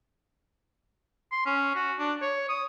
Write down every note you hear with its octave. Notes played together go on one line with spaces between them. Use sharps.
C6
C#4
F#4
D4
C#5
D#6